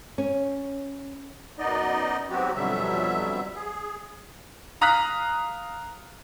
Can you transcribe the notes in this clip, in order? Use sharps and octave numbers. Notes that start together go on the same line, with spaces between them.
C#4
F#2 B3 D#4 D5 D#5
G#2 F#3 B3 C4 F#4 G4
F2 B2 D3 F#3 G3 E5
G#4
F5 A#5 D#6 F6 F#6 B6